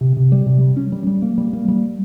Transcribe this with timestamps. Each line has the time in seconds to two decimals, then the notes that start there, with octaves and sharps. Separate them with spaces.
0.01 C3
0.17 C3
0.32 G3
0.46 C3
0.61 G3
0.77 C#4
0.92 G3
1.07 G3
1.22 A#3
1.38 G3
1.53 A#3
1.68 G3